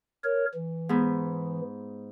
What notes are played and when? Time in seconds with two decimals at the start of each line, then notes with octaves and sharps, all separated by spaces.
0.24 A#4 C#5
0.54 E3
0.89 G#2 B3